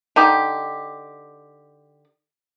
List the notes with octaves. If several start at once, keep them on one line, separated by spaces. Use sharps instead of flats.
D3 D#4 G4